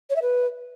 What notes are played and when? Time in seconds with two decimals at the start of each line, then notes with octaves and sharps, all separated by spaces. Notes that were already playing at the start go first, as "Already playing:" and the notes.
0.09 C#5
0.15 E5
0.21 B4